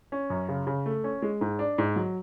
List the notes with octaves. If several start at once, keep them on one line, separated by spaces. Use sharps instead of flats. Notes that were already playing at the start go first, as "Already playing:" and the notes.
C#4
F#2
C#3
C#3
A3
C#4
G#3
G#2
D4
G#2
F#3